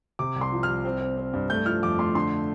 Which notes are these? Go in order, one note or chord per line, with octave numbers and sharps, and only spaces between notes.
C3 D6
C2
C6
F3
C2 F6
C4
C4
C4
G2
A3 G6
F3 F6
F2 D6
A3 C6
D3 C6